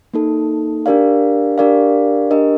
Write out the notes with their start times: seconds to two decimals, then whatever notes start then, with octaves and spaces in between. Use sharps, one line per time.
0.14 A#3 D#4 A4
0.86 D4 G4 A#4 D5 F5
1.58 D4 G4 A#4 D5 F5
2.31 D4 G4 A#4 D#5